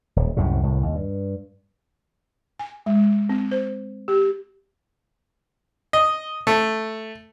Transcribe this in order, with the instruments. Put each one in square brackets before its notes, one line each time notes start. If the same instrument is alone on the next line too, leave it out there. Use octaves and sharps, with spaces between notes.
[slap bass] D#1
C2 F#2 A2 C3
C2 A2
D#2
G2
[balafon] G#5
G#3
C4
C5
G4
[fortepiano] D#5
A3